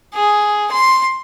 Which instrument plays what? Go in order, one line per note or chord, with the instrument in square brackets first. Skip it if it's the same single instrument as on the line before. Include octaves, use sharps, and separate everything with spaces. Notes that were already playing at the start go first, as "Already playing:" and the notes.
[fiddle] G#4
C6